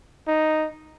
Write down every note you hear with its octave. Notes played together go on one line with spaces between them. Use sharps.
D#4